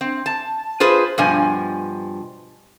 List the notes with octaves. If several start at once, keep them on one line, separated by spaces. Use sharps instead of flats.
C4
A5
F4 G#4 B4 C5
G2 B2 F3 G#5